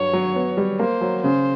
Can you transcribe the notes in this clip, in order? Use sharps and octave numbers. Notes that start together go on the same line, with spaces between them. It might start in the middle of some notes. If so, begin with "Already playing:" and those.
Already playing: G2 F#3 C#5
F#3
B3
G3
A#3 C5
F#3
C#3 C5